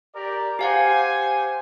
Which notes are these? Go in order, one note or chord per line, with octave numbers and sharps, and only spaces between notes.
G4 A#4 D5
G4 C5 F5 F#5 G#5